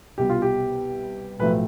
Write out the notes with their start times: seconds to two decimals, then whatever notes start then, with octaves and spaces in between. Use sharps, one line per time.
0.18 C2 B2 B3 G4
0.30 F4
0.42 G4
1.39 B1 A2 F3 A3 B4